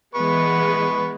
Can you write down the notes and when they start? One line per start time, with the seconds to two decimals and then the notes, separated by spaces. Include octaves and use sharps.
0.15 E3 G#3 B3 B4 C#6